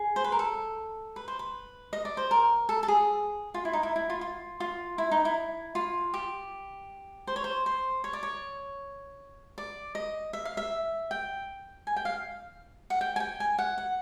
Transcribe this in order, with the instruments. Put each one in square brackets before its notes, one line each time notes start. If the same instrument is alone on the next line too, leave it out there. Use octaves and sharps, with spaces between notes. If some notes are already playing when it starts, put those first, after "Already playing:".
Already playing: [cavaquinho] G#4
C5
B4
A#4
A4
B4
C5
B4
D#5
D5
C5
A#4
A4
A4
G#4
F4
E4
D#4
E4
E4
F4
F4
F4
E4
D#4
E4
F4
G4
C5
C#5
C5
C5
C#5
D5
C#5
D5
D#5
E5
F5
E5
G5
G#5
G5
F5
F#5
G5
G#5
G5
G#5
F#5
F#5